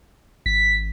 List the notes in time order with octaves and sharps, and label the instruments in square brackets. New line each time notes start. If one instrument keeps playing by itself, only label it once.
[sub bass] G#1 [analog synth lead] B6